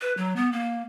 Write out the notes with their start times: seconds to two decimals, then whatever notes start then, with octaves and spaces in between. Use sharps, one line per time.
0.01 B4
0.17 F#3
0.36 B3
0.52 A#3